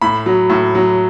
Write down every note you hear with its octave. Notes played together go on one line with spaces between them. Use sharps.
A2 B5
F#3
A2
F#3